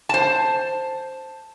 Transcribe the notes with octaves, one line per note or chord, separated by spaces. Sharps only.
C5 A5